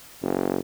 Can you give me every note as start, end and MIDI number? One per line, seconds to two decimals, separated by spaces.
0.22 0.60 30